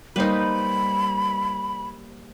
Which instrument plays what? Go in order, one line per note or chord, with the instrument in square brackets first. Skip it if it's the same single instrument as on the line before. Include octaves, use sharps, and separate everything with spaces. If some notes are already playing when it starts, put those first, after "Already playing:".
[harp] G3 A#3 C5 [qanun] D#4 B4 [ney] B5